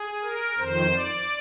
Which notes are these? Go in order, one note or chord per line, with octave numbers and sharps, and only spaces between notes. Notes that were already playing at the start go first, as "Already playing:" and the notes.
Already playing: G#4
A#4
F2 D#3 C5
D5